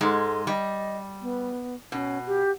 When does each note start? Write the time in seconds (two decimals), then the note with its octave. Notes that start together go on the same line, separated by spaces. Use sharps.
0.01 G#2 G#3 A4
0.47 G3 D#5
1.22 B3
1.92 B2 C#4
2.26 G4